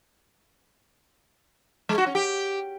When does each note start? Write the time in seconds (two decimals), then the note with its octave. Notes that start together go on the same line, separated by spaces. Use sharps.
1.89 G#3
1.98 F#4
2.06 C#4
2.15 G4